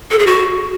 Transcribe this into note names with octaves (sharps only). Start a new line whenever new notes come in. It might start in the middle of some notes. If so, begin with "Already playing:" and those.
A4
G#4
F#4